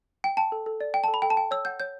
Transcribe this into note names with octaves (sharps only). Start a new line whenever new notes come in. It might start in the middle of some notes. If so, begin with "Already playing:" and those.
G5
G5 A5
A4
A4
D5
G5
A5
A4
B5
A4 G5
A5
G5
C#5 E6
F#5 G6
C#5 G6